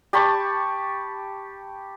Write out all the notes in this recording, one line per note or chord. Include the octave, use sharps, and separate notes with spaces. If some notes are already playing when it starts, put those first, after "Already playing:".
G4 A5 B5 C#6